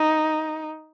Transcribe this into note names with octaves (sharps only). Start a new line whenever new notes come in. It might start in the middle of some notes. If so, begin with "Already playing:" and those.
Already playing: D#4